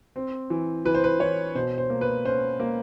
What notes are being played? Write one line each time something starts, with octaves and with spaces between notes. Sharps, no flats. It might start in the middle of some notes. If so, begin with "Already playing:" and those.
C4
E3
E3 B4
C5
B4
E3 C#5
B2 C5
C5
A#3
B4
C#4 C5
A#3